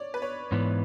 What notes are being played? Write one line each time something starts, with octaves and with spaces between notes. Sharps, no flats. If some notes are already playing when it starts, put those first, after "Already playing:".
Already playing: C#5 D5
B4
C#5
G#2 E3 B3